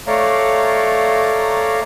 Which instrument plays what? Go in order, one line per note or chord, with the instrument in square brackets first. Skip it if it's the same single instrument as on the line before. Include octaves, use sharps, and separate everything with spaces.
[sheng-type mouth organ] A3 C#5 D5 F5 A#5